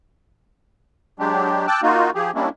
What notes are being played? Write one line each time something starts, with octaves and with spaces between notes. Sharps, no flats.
F#3 G#3 D4 G4
G5 A5 D6 E6 F#6
A#3 D#4 F4 F#4
F3 G4 G#4
G3 G#3 A#3 C#4 D4 E4